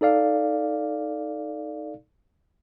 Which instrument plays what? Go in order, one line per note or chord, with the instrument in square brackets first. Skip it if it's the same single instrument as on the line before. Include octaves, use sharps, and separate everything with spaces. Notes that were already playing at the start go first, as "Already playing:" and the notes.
[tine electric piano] D#4 A4 D5 F5